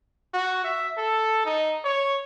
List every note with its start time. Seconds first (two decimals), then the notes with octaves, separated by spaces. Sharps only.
0.34 F#4
0.64 E5
0.98 A4
1.45 D#4
1.84 C#5